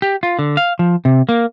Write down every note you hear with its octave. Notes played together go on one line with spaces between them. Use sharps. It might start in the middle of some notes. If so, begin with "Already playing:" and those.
G4
F4
D3
F5
F3
C3
A#3